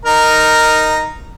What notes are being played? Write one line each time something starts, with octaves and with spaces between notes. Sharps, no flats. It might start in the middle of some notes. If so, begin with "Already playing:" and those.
D#4 A#4 A#5